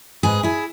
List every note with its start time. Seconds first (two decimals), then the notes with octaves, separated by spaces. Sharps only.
0.23 G#2 G#4 B4
0.43 E4 G#4